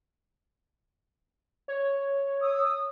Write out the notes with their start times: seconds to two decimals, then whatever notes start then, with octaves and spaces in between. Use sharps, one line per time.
1.68 C#5
2.42 D#6 E6